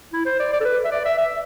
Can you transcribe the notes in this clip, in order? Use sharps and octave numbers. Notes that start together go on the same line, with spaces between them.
E4
C5
D5
D5
A4
B4
E5
D5
E5
E5